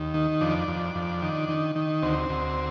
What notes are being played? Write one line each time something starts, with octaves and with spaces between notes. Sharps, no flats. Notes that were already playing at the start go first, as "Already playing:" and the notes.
Already playing: D#2
D#3
F2 D4
F2
F2
D#3
D#3
D#3
D2 C4
D2